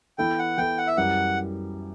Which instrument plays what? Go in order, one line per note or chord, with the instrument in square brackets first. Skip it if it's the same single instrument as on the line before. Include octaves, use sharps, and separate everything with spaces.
[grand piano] E3 B3 E4 A4 [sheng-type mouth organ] G5
[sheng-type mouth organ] F#5
[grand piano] E3 B3 E4 A4 [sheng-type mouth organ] G5
[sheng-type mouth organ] F#5
E5
[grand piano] F#2 E3 G3 [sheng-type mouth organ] F#5